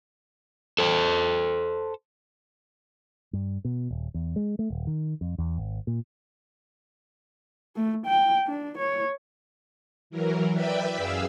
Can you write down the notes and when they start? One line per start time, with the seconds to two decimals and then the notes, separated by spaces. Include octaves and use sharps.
0.79 A4 C5
3.33 G2
3.65 B2
3.90 D#1
4.14 E2
4.36 G#3
4.59 A3
4.70 D#1
4.87 D#3
5.21 F2
5.38 E2
5.58 G#1
5.87 A#2
7.76 A3
8.06 G5
8.47 D4
8.78 C#5
10.10 E3 F#3 A#4
10.53 B4 D5 E5 G5 B5
10.96 F#2 G#4 F5 E6